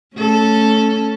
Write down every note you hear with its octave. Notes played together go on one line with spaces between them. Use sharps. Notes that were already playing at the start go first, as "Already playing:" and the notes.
A3 C#4 A4